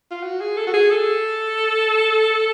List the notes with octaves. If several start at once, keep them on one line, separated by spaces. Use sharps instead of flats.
F4
F#4
G#4
A4
F#4
G#4
A4